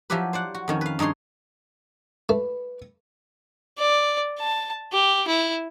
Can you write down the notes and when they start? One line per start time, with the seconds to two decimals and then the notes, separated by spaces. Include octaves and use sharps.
0.10 F3 F#3 E4 G4 B4
0.33 C5 D5 F#5
0.54 F#4
0.68 F2 D#3 C#4
0.81 B4 F5
0.99 G2 D#4 G#4 C#5 C6
2.29 A3 B4
3.78 D5
4.39 A5
4.92 G4
5.28 E4